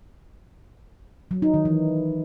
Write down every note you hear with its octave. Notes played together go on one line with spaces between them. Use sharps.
F#3
D#4
D#3
E3